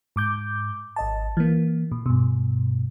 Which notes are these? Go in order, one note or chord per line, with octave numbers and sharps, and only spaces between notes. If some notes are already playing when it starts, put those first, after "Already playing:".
G#2 D6 G6
G#1 D#5 A5
E3 A#3
A#2
G2 B2